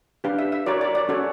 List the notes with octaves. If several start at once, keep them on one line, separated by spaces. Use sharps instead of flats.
D4 G4 B4 F5
E5
E5
F#4 A#4 C#5 D5
D5
D5
C#4 F#4 A4 C#5